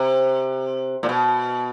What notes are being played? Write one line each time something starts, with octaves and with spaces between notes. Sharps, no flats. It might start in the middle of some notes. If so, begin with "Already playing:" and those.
Already playing: C3
A#2
B2